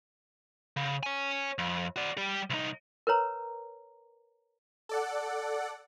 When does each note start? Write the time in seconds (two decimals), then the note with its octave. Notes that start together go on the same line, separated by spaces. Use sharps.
0.77 C#3
1.03 C#5 G#5
1.58 F2
1.96 F#4 D5
2.17 G3 G4
2.50 C2 D#4
3.07 A#4 B4 C#5 A#5
4.89 A4 D5 F#5